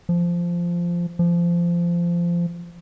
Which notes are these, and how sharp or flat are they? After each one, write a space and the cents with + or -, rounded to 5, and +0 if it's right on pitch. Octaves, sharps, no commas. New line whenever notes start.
F3 -10
F3 -20